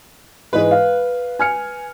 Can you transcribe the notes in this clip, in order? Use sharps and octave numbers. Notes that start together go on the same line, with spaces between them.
G#2 E3 G#3 B4
F5
G#5 F6 C#7